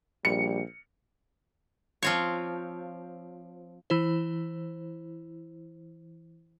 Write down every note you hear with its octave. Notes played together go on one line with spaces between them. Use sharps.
A#1 G3 C#7
F3 C4 C#5
E3 E4 C5